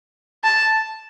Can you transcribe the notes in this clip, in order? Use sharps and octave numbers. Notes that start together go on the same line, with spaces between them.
A5